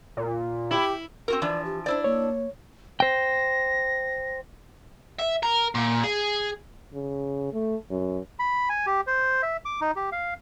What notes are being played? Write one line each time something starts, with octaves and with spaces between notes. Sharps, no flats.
A#2
E4 G4
C4 F#4 A#4
E3 F3 D4 D5
G4
D4 E4 C5 D5
A#3 C#5
C5 G5 A#6
E5
A#4
A#2
G#4
C#3
A3
F#2
B5
G#5
G4
C5
E5
D6
D#4
G4
F5